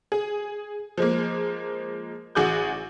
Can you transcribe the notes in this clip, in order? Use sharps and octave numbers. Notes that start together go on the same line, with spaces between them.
G#4
F3 G#3 A#3
A1 F#4 G#4 D6 G6